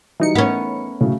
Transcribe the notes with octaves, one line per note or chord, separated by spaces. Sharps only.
E3 F#3 G3 D#4 C#7
A3 B3 C#4 A#4
A2 C#3 F#3 A3